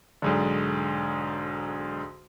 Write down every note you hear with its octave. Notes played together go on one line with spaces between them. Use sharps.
B1 G#2 D3